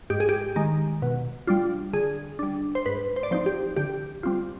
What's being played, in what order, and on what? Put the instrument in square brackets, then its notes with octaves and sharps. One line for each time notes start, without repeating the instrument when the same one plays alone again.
[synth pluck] G#2 G4
G#4
G4
D#3 G#3
B2
G3 D4 F4
D3 G#4
G3 D4
C5
G#2 B4
C5
D5
F3 C4 D#4 C5
G4
D3 G4
G3 C4 F4